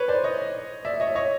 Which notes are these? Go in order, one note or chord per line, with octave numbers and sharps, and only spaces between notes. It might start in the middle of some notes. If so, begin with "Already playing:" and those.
Already playing: B4 C#5
C5 D5
C#5 D#5
D5 E5
C#5 D#5
C#5 D#5